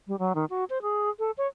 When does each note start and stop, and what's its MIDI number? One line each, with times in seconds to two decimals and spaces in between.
0.08 0.18 55
0.19 0.33 54
0.35 0.45 51
0.50 0.64 66
0.70 0.78 72
0.82 1.09 68
1.19 1.31 69
1.38 1.47 73